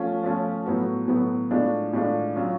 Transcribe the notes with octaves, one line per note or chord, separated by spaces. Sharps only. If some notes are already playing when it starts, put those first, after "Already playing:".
Already playing: F3 A3 C#4 F4
F3 A3 C#4 F4
A2 F#3 B3 F#4
A2 F#3 B3 F#4
A2 G#3 D4 F4
A2 G#3 D4 F4
F#3 C#4 F4